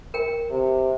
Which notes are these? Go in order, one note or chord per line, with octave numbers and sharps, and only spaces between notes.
A#4 G5
C3